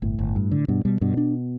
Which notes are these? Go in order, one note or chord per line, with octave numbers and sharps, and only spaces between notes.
G1 A2
G1
G2
D3
G2 B2
B2 G3
G2 B2
D4